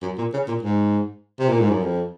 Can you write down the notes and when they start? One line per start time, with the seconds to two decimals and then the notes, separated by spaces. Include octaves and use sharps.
0.02 F#2
0.18 A#2
0.33 C#3
0.48 A#2
0.63 G#2
1.39 C3
1.49 A#2
1.60 G#2
1.70 F#2
1.82 F2